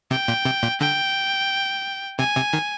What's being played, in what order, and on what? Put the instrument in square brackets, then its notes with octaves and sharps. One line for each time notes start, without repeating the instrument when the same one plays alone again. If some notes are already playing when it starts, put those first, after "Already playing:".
[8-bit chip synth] C3 [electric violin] G5
[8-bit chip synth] A#2
C3
A#2
[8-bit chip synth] D3 [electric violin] G5
[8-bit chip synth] C3 [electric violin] G#5
[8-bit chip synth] C3
D#3